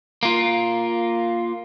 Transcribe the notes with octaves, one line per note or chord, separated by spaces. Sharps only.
A#3 F4